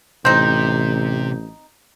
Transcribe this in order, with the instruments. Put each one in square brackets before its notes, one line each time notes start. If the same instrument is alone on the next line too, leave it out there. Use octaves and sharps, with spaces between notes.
[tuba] A1 [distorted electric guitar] C3 [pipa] C4 D#4 [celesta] G6